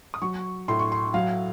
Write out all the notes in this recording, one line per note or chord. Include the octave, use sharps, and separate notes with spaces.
D#6
F#3 C#6
A2 C6
C#6
C6
F#3 F5